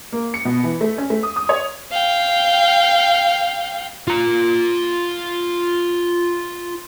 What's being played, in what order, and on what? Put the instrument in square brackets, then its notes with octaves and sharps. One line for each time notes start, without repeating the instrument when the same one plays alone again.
[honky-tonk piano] A#3
C#7
B2
E3
A3
C#4
A3
D#6
D#6
C#5
[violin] F5 G5
[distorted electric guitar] F4 A#5